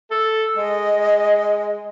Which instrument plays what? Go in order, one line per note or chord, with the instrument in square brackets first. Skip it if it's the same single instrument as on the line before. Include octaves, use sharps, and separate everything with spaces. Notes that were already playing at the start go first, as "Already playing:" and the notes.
[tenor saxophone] A4
[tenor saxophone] G#3 [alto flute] D#5